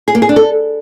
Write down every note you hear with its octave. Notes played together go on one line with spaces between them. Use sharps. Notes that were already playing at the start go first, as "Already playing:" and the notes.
G#4
A#3
G#4
D4
A4